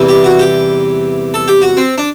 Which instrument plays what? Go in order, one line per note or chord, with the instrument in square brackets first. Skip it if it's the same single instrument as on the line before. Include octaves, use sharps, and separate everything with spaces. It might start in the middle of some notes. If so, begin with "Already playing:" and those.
Already playing: [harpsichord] E2 C3 E3 G3
G4
F#4
G4
A4
G4
F#4
C4
D4